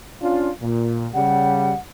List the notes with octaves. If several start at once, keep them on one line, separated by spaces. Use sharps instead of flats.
C#4 D4 F4
A#2
C#3 G3 F#5